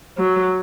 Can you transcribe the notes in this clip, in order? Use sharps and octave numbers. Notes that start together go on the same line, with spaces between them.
F#3